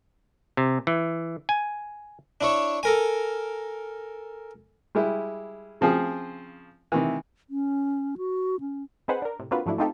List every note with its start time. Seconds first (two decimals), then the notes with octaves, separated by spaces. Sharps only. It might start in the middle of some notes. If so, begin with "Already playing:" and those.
0.57 C3
0.87 E3
1.49 G#5
2.41 D4 E4 C#5
2.83 A4 A#4 G#5
4.95 G3 G#3 E4
5.81 C#3 F3 C4 G#4
6.92 C3 D#3 E3
7.50 C#4
8.17 F#4
8.60 C#4
9.08 C4 D#4 G#4 B4 C5 F#5
9.22 D4 A#4
9.39 A2 C3
9.51 A#3 C4 D4 F4 F#4 B4
9.66 G#2 F3 F#3 A3 D4 E4
9.78 A3 C4 D#4 F4 G4 A4